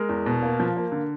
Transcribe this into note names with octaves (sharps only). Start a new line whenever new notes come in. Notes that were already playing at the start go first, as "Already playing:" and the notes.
Already playing: G#3 A#4
E2
B2
A#3
F3
A#3
D3